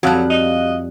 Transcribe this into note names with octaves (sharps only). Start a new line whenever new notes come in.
F2 F#3 G3 F#4 F5 F#6
D#5